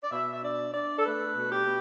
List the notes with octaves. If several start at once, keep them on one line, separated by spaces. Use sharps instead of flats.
D5
B2 E5
E5
D4 D5
D4 D5
A4
A3 B4
B2
G4
B2